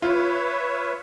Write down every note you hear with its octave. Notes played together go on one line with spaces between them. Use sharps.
F4 B4 C#5 E5